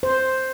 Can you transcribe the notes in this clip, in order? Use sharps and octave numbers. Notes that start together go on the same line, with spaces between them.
C5